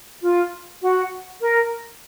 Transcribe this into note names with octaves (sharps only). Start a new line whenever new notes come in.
F4
F#4
A#4